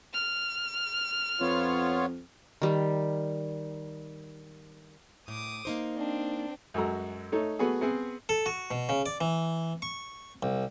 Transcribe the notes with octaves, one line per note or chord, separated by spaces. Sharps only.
F6
F2 B3 F4 C#5
D#3 G3
A2 D6 D#6
A#3 D#4 C5
C4 D4
F#2 G#3 F#4 A4 A#5
A3 D#4 C#5
A3 B3 F#4 G#4
B3 C4 G#4
A4
F#4
B2
C#3
D5
E3
C#6
C2